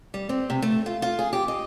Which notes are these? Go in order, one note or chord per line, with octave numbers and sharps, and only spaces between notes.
G3
C4
C3
A3
F4
F4
G#4
G4
D#5